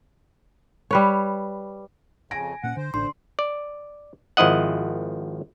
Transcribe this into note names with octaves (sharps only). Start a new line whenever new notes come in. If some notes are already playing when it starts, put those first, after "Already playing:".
G3 B4 C#5
F2 C#3 G#5 A#6 D7
A#2 A#3 C#4 F#5
D3 C5
A1 D3 C6
D5
G#1 F3 E4 D#5 F#5